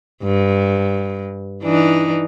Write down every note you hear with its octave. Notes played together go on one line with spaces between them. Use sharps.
G2
E3 D4 D#4